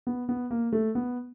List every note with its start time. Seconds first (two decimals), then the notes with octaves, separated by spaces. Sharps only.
0.07 B3
0.29 B3
0.50 A#3
0.73 A3
0.95 B3